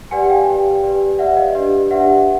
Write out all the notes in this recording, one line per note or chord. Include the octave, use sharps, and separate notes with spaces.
G4 B4 D5 F#5 G#5
G#5
F5 G5
G4 B4 D5
G4 B4 D5
G4 B4 D5 E5 F#5
D#5 F5
D4 G4 B4 D5
D4 G4 B4 D5 E5 F#5